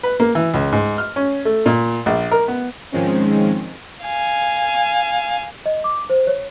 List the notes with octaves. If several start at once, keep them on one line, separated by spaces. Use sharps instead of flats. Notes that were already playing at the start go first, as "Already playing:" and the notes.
B4
A#3
E3
C#2
G#2
F6
C#4
A3
A#2
A#1
A#4
B3
G#2 D#3 F3 G#3 C4 C#4
F5 G#5
D#5
D6
C5
C#5